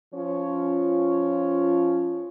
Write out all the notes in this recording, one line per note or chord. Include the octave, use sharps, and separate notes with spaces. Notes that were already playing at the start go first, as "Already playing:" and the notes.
F3 C#4 F4 C#5